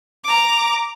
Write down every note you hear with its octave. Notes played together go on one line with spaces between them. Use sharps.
A#5 D6